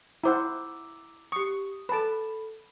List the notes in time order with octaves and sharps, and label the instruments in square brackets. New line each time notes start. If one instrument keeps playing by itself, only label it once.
[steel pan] E4 C5 F#5 [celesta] A#5 D6 E6
[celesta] G4 D#6 [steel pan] C#6
[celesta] A4 B5 [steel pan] B4 A5